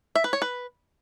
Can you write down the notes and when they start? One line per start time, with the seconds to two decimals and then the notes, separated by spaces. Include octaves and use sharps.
0.15 E5
0.24 B4
0.33 C#5
0.42 B4